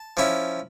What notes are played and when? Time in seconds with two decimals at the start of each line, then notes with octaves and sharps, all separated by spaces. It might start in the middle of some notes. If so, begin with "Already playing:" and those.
Already playing: A5
0.17 F3 C#4 E4